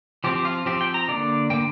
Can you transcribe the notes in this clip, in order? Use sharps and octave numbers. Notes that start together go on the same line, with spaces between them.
F3 C4 G4
F4
F3 C4 G4
G5
A#5
D3 A#3 D5
D3 A#3 G5